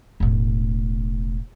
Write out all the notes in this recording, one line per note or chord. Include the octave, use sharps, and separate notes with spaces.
E1 A2